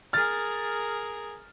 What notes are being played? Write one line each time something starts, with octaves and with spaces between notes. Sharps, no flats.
G#4 A#4 F6 A6